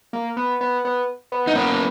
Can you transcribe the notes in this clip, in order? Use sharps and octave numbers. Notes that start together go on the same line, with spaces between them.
A#3
B3
B3
B3
B3
D#4
A#3 B3 C#4